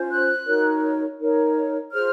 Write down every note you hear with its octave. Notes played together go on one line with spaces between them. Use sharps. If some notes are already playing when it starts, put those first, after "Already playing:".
Already playing: C#4 F4 C5
F#6
D#4 F#4 A#4 C#5
D#4 A#4 C#5
F4 G#4 C5 F6